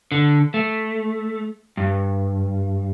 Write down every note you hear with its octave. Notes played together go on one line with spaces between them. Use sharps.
D3
A3
G2